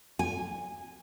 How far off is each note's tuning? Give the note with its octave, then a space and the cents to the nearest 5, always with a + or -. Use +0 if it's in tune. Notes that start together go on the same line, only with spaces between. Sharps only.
G#5 -15